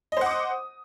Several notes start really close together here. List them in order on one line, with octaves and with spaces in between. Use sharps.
D#5 C5 F#5 D6 D#6